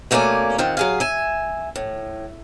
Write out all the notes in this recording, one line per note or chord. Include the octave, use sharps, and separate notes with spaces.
B2 A3 A#3 C#4 D5 G#5
D#3 C4 F4 F#5
F#3 G#4 F5
E5 G#5
A2